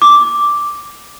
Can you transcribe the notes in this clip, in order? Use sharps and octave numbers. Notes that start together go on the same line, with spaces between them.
D6